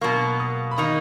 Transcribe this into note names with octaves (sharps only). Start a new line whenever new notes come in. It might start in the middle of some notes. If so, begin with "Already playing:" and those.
B2 F#3 A#3 C#6
D#6
B5
D#3 A#3 D#4 C#6